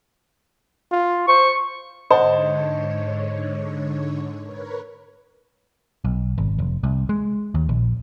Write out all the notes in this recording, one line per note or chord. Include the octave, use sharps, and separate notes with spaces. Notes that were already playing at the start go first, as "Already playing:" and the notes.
F4
C5 C#6
G#2 D3 C5 C#5 D#5 F#5 A5
A#4 B4 C#5
B1
G#1
F1
C2
G#3
D#2
A#1